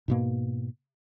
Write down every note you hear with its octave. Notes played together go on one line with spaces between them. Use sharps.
G#2 B2 A#3